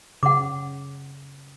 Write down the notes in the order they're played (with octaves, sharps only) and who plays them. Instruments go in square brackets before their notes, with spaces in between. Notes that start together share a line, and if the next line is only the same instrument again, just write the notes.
[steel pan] C#3 [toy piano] F#5 D6